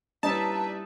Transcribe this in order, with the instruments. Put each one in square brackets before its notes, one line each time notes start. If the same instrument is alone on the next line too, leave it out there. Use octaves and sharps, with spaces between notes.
[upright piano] G3 C#4 E4 [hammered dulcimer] D#4 [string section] B4 D5 E5 [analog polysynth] A5